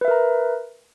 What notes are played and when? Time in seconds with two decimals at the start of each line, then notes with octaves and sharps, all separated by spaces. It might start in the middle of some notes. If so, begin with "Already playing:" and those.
0.01 B4
0.05 E5
0.08 A#4
0.11 A#5